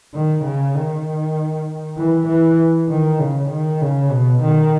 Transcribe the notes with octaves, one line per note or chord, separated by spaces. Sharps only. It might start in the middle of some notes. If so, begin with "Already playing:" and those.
D#3
C#3
D#3
E3
E3
D#3
C#3
D#3
C#3
B2
D#3